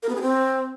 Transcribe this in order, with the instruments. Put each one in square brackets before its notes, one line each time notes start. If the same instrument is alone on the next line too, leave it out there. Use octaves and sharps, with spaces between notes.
[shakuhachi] A#4
B3
G#4
C4